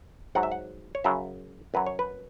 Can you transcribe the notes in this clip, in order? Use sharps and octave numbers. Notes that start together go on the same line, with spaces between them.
G#2 F#3 F#5
E5
F#5
C#5
F#2 C#3 F#3 E5
F#2 F#3 B4
C#5
B4